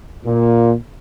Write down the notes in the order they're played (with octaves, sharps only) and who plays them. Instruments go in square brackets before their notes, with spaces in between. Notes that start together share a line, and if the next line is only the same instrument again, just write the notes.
[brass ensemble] A#2